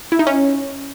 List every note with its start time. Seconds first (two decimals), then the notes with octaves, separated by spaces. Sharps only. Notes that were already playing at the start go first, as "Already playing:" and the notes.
0.12 E4
0.19 D#4
0.27 C#4